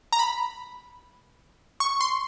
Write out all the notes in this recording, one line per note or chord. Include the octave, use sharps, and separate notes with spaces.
A#5
B5
C#6
C6